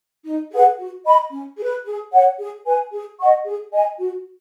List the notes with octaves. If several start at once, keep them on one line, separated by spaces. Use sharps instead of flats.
D#4
G#4 B4 F#5
F#4
D#5 B5
C#4
G#4 B4
G#4
C#5 F#5
G#4
B4 G#5
G#4
D#5 F#5 C#6
G#4
D#5 G#5
F#4